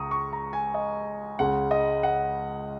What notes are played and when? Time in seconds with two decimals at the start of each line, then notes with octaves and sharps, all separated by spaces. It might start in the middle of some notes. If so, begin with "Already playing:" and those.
Already playing: C#2 C#3 G#3 A#5 C#6 D#6
0.11 C#6
0.33 A#5
0.53 G#5
0.74 D#5
1.39 C#2 C#3 G#3 F#5
1.71 D#5
2.03 F#5